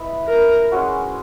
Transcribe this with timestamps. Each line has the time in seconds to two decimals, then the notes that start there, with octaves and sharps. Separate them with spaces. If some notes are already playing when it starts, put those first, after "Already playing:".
Already playing: E4 B4 D#5
0.29 A#4
0.72 G#3 C#4 F#4